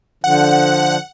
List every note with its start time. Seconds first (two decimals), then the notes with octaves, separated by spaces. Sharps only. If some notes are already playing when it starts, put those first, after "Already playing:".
0.24 D3 F3 F#5